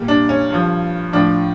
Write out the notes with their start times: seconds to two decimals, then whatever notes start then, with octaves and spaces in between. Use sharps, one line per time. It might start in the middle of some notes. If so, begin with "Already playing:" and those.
Already playing: A#2 G3
0.08 D4
0.29 C#4
0.50 G2 F3
1.13 A2 F3 D4